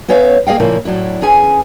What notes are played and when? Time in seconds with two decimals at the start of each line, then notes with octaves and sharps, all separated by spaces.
0.08 B3 C#4 C#5 E5 F5
0.47 A#3 G#4 D#5 F5 G5
0.60 A#2 C#3 F3 A#3 E4
0.85 A2 F#3 D4 E4
1.22 E2 C#4 G#4 G#5